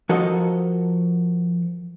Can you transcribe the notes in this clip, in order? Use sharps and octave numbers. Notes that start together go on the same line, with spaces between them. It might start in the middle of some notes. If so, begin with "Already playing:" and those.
F3 F#4 A4 A#4 D#5